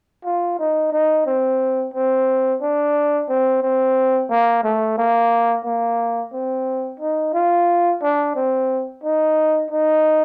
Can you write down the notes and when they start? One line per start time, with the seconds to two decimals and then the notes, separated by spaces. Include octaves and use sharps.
0.25 F4
0.59 D#4
0.92 D#4
1.26 C4
1.94 C4
2.62 D4
3.29 C4
3.63 C4
4.30 A#3
4.64 A3
4.98 A#3
5.65 A#3
6.33 C4
7.00 D#4
7.34 F4
8.02 D4
8.36 C4
9.04 D#4
9.71 D#4